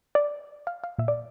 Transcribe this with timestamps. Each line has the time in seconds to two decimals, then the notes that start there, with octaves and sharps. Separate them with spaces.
0.15 D5
0.67 F5
0.84 F5
0.98 A#2 E5
1.08 D5